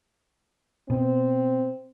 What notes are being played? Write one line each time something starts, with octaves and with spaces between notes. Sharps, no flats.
B2 C4